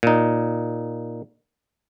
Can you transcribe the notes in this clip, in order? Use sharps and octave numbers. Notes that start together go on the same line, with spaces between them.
A#2 D#4